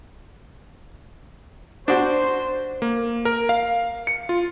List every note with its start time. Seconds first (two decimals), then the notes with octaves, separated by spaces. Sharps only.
1.88 D4 F#4 C5
2.82 A#3
3.25 A#4
3.49 F5
4.07 C#7
4.29 F4